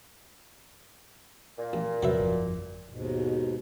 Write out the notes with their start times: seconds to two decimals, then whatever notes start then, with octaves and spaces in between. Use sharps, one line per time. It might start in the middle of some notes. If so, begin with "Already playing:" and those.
1.58 A#2
1.73 A1
2.03 E2 C3 F#3 B4 E5
2.19 G1 F2 F3
2.89 D#2 G#2 B2